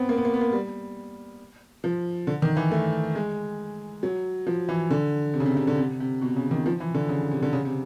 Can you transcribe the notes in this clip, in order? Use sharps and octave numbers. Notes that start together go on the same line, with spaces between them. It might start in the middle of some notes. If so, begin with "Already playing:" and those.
Already playing: B3 C4
A#3
B3
A#3
B3
A#3
G3
F3
D3
D#3
E3
A3
G#3
F#3
F3
E3
D3
C3
C#3
C3
C3
D3
C3
C3
B2
C#3
D#3
F3
E3
D3
C#3
C3
D3
C#3
C3